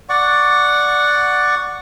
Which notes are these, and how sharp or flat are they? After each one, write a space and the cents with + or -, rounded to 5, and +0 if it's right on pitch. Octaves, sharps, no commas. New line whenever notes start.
D5 +0 F#5 -5 C#6 +15